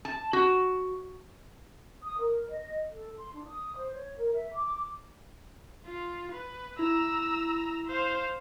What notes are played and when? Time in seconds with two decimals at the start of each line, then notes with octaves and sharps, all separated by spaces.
0.05 A5
0.33 F#4
2.01 D#6
2.19 A#4
2.48 D#5
2.92 A4
3.18 C6
3.34 D4
3.46 D#6
3.76 C5
3.94 C#5
4.17 A#4
4.33 E5
4.54 D6
5.85 F4
6.32 B4
6.79 E4 A#5 E6
7.87 C5 F5